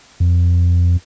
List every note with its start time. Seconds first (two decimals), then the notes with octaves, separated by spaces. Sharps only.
0.20 F2